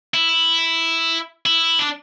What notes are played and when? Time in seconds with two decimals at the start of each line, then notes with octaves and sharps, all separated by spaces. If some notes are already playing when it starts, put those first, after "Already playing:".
0.14 E4
1.46 E4
1.79 D4